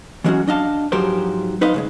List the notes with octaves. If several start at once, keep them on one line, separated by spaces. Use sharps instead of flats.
E3 F#3 G#3 A#3 C#4 F#4
D4 D#5 F5 A5
G#2 F3 F#3 G4 A#4 C5
D#4 B4 C5 D#5 F5
C#3 F#3 G#3